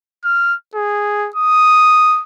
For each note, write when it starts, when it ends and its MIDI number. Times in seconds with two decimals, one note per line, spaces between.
0.25 0.55 89
0.75 1.30 68
1.36 2.22 87